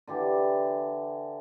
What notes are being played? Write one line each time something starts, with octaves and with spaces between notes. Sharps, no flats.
D3 E3 G4